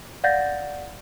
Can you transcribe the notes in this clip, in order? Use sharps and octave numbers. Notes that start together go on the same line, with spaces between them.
D5 F5 F#5 G6 A6 A#6